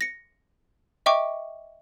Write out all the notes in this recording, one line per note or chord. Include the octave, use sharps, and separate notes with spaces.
A#6 C#7
D#5 E5 G5 C#6 D6